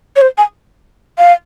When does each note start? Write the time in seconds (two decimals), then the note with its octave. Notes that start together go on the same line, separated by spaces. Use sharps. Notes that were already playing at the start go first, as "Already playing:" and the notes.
0.16 C#5
0.21 C5
0.38 G#5
1.18 F5